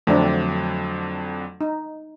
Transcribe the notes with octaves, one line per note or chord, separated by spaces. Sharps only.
F2 D3 F#3 A3 C4 D4
D#4